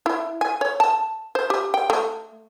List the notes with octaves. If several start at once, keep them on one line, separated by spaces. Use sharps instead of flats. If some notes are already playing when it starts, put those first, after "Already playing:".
E4
G#5
C#5
A5
C5
G4
G5
A3